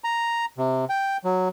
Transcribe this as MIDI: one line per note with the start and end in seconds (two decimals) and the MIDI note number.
0.04 0.45 82
0.58 0.85 48
0.89 1.17 79
1.25 1.48 54